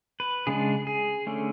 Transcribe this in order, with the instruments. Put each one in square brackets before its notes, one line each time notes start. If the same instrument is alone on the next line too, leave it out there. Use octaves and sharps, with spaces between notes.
[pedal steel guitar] B4
C#3 G#3 D4 G#4
G#4
D3 A3 C#4